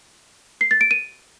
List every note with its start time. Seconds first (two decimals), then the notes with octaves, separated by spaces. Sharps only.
0.61 C7
0.71 A6
0.81 D7
0.91 D#7